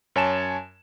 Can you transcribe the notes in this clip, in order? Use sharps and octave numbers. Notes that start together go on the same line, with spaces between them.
F#2 C#5 G#5 A5 E7